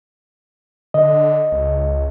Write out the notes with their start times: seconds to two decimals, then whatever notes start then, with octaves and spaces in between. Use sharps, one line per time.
0.94 D3 D#5
1.52 C#2